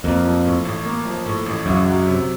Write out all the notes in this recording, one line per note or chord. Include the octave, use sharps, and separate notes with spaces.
F2 A#3
F3
A2
A1
A#3
F3
A2
A1
C#2 F#2
F#3
C3